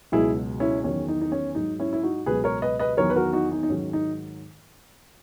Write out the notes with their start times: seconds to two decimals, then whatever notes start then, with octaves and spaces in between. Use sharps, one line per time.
0.12 C#2 B2 F#3 E4 G#4
0.60 C#4 E4
0.83 E2 D#3 F#3 C#4
1.08 D#4
1.21 D#4
1.32 C#4
1.55 G#2 F#3 D#4
1.79 C#4 E4
1.93 E4
2.03 D#4 F#4
2.26 C#2 B2 F#3 G#4 B4
2.44 A#4 C#5
2.62 B4 D#5
2.79 B4 D#5
2.97 E2 D#3 F#3 A#4 C#5
3.10 B4
3.16 F#4 A#4
3.33 D#4 F#4
3.52 D#4
3.63 D#4
3.69 G#2 D#3 F#3 C#4
3.93 D#4